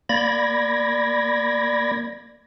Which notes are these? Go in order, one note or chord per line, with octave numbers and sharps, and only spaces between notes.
A#3 D5 B5 G#6 A#6